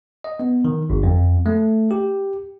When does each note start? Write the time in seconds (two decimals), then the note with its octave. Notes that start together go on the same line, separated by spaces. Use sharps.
0.24 D#5
0.40 B3
0.65 D#3
0.90 G1
1.03 F2
1.46 A3
1.91 G4